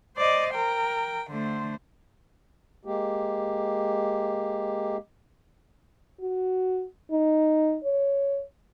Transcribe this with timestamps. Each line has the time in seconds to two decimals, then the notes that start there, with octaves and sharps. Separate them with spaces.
0.17 C5 D5 D#5
0.54 A#4 G5
1.31 D3 A3 C5
2.85 G#3 A#3 G4
6.21 F#4
7.11 D#4
7.84 C#5